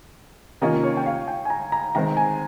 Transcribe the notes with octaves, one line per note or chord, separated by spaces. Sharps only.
C3 D#3 A#3 C#4 F4 D#5
C#5
G5
F5
G5
G#5
A#5
A#5
D#3 G#3 C4 A#5
G#5